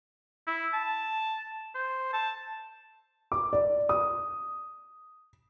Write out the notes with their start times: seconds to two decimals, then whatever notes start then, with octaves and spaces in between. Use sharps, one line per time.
0.47 E4
0.74 A5
1.75 C5
2.13 A5
3.32 D6
3.53 D5
3.89 D#6